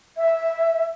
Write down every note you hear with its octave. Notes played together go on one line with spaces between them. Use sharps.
E5